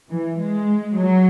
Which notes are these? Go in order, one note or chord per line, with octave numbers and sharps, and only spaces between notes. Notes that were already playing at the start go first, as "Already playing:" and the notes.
E3
G#3
F#3